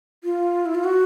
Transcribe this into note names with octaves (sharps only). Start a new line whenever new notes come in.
F4
E4
F4
F#4